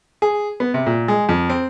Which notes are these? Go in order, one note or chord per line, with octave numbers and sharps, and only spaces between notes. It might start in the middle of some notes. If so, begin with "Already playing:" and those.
G#4
B3
C3
A#2
G#3
F2
C4